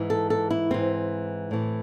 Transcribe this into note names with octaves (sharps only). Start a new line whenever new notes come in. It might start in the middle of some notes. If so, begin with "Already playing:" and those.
Already playing: G#2 E3
A4
A4
E4
G#2 E3 C4
A2 E3